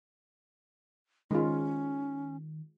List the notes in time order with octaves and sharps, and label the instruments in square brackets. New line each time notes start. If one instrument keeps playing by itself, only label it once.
[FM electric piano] D#3 [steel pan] G#3 F4 [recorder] C#4